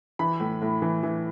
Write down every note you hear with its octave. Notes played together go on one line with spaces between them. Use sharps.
E3 B5
A2
A2
E3
E3